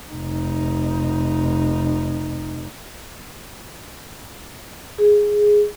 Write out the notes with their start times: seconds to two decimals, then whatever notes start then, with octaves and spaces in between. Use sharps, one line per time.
0.12 F1 D#4
4.98 G#4